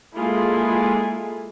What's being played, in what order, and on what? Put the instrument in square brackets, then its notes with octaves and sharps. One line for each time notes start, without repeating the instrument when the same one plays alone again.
[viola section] G#3 A#3 E4 F4 G#4 A4